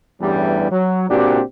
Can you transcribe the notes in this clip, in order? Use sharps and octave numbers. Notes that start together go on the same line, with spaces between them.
A1 E2 G2 E3 G3
F#3
C#2 A#2 C4 D4 F#4 G4